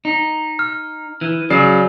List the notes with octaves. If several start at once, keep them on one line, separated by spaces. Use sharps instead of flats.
D#4
F6
E3
C#3 F#3 D5 C7